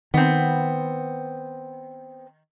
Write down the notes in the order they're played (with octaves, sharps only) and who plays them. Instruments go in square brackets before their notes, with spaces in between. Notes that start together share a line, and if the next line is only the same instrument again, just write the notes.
[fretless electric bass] D#3 [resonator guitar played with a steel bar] B3 C4